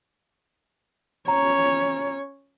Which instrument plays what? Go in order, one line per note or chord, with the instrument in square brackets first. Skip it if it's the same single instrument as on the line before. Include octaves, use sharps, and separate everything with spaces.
[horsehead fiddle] C#4 C#5 [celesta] A#5